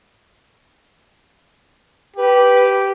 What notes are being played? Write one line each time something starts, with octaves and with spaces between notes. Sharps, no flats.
G4 B4